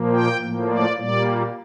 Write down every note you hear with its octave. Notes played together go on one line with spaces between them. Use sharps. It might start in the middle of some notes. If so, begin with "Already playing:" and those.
Already playing: A#2 F3 A#3
G5
A2 F3 A#3
D5
A#2 G3 A#3 D5